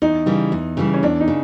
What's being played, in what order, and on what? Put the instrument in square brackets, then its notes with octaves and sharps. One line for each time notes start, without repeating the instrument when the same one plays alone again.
[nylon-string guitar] E2 [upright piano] D#4
[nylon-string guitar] C#3 E3 G3
E2
C#3 E3 G3
[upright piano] C#4
[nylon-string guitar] E2 [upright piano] D4
[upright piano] D#4
[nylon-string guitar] C#3